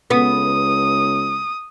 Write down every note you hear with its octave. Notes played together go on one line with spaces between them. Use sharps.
C#2 B3 D#6